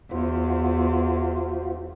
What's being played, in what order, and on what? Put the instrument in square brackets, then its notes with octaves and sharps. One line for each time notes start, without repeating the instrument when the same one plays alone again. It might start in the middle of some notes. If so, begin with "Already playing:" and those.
[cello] E2 [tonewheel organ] F4 F#4 C5